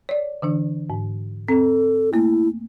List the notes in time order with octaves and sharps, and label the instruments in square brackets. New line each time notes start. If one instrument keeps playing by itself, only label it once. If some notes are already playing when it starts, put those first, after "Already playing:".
[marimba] C#5 D5
D3 E3 D4
G#2
[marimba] C4 [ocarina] A4
[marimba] A3 A#3 [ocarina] E4